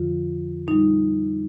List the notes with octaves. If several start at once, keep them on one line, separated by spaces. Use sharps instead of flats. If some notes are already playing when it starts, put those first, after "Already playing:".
Already playing: F2 D3 F3 F4
A#2 G3 D#4